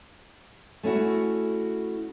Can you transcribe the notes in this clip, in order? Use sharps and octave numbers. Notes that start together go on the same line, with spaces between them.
A3 C#4 E4 F#4